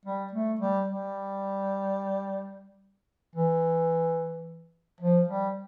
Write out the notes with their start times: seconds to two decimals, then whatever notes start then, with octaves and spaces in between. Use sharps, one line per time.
0.06 G3
0.33 A3
0.61 G3
0.88 G3
3.35 E3
5.01 F3
5.28 G3